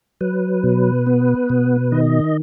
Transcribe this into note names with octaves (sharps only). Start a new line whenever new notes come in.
F#3 B4
B2
B3
B2
D#3 D#5